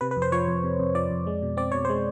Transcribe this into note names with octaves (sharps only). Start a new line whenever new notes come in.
C3 B4
B4
F2
C5
F3 C#5
F2
C3
F2
F3 D5
F2
G#3
B2
C4 D5
B2 C#5
G#3 C5